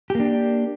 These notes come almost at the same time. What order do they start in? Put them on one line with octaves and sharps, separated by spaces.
G4 A#3 D4